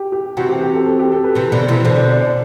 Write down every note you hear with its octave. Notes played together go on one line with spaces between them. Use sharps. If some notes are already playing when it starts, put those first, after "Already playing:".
Already playing: G4
G4
C3 E3 F#4
G4
G4
A4
A4
G4
A4
B4
C3 E3
B2 D3
C3 E3
B2 D3 C5
D5
D5
D5